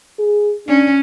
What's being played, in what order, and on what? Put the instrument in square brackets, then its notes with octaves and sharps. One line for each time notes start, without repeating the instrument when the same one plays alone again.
[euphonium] G#4
[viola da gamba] C#4 [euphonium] D4